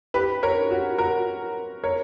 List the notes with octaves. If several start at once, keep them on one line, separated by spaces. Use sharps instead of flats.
G4 B4
A#4 C#5
F#4
F#4 A#4
A#4 C#5